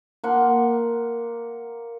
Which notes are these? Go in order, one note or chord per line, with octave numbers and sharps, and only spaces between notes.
A#3 F#5 C6